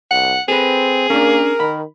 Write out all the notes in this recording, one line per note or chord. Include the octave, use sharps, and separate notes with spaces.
C2 F#5
C4 G#4 A4 B4
A#3 C#4 D4 A#4
D#3 B5